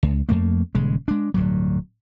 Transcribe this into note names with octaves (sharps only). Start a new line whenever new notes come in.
C#2
F2 A3 A#3
D#1 C#3 G#3
G#3 D4
D1 G2 F#3